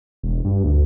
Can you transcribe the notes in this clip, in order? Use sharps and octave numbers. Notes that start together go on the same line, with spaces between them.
E1
G2
D2